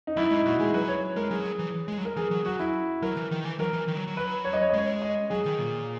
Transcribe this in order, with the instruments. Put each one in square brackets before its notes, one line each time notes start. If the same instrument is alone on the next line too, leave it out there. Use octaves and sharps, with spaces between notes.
[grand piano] D#4
[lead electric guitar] F#2 [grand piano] E4
[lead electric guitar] G#2 [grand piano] D#4
[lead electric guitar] A#2 [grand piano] F#4
[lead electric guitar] G#3 [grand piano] G#4
[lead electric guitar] F#3 [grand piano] B4
[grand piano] C#5
[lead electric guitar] G#3 [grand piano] A#4
[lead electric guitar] F#3 [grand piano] G#4
[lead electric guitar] E3
G#3
F#3
[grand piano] A#4
[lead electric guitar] E3 [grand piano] G#4
[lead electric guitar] F#3
[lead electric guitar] F#3 [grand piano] F#4
[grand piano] E4
[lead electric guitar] F#3 [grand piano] A#4
[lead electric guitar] E3
D#3
E3
[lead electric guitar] F#3 [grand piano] A#4
[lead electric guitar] E3
D#3
F#3
F#3
[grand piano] B4
C#5
D#5
C#5
D#5
[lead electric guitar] G#3 [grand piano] C#5
[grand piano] D#5
[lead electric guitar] F#3 [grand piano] G#4
[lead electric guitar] D#3
A#2